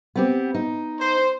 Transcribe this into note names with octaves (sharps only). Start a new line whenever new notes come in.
B3 C4 G4
D#4
C5